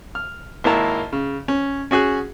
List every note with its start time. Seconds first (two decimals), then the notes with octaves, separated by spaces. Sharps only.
0.15 F6
0.64 G#1 A#3 E4 A5 A#5
1.13 C#3
1.48 C#4
1.91 C#4 F#4 G#4 F#6